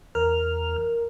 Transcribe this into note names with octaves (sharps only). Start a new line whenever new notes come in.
E2 A#4 F6